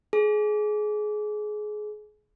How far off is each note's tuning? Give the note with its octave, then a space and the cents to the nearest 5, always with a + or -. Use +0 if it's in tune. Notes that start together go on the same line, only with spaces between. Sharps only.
G#4 +25